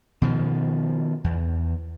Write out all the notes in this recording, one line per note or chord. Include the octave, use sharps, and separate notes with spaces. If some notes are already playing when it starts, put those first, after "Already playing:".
B2 D#3 F3
E2